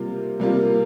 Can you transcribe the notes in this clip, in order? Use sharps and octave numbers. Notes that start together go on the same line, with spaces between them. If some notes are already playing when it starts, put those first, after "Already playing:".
Already playing: C3 G3 A#3 F4
C3 G3 A#3 F4